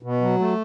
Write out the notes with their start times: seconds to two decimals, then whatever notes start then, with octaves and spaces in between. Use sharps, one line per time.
0.03 B2
0.21 F#3
0.39 A3